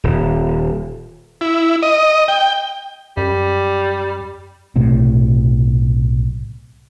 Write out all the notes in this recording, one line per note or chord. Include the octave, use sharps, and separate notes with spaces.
D#1
E4
D#5
G5
F#2 G3
B1 A2 C3